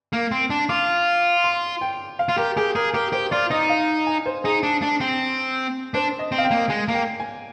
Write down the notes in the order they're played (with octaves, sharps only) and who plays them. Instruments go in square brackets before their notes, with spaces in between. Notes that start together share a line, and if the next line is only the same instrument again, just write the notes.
[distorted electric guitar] A#3
C4
D4
[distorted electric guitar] F4 [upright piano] D6
[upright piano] C6
G5
F5
[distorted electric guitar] F4
[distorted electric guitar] G4 [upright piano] A#4
[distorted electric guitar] G4 [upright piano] G#4
[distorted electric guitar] G#4 [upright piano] A#4
[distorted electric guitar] G4 [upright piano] A#4
[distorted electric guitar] G4 [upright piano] C5
[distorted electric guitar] F4 [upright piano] D5
[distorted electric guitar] D#4 [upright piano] D#5
[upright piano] F5
G#5
C5
[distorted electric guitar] D#4 [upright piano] G#4
[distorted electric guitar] D4
D4
C4
[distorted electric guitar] D4 [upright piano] C5
[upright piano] D#5
[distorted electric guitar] C4
[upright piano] F5
G5
[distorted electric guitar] A#3
[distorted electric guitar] G#3 [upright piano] G#5
[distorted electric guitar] A#3
[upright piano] G5
G#5